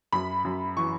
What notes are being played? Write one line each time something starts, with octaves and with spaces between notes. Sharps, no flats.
F#2 B5
F#2
E3 C#6